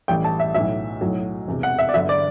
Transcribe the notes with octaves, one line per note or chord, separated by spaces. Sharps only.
A1 A2 E3 G3 G5
A5
E5
B1 A2 F#3 E5
B1 A2 F#3
E1 E2 C3
F#5
E5
D5
G1 G2 D3 F#3 E5
D5